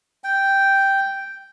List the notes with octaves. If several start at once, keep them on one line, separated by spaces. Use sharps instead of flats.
G5